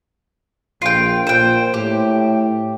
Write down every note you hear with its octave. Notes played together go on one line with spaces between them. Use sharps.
A#1 F4 G5
A#2 C5 G5
A2 G4